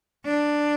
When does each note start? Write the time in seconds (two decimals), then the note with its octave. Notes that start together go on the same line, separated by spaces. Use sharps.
0.25 D4